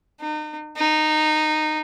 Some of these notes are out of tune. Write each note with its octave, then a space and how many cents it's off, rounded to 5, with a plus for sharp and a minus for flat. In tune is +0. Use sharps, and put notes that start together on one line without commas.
D#4 -35
D#4 -15